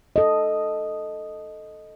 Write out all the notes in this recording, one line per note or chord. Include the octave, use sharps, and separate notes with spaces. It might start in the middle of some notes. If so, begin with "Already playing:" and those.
A4 D#5